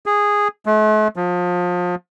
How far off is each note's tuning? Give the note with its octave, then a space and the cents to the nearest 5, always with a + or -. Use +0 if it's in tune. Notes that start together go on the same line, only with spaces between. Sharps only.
G#4 -10
A3 -45
F3 +30